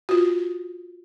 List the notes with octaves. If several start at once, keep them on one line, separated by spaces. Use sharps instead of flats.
F4 F#4